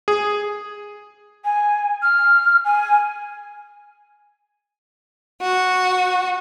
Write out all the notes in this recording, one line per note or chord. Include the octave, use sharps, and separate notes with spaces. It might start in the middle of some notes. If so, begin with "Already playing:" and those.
G#4
G#5
F6
G#5
F#4